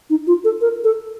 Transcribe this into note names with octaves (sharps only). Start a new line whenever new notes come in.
D#4
F4
A4
A#4
A4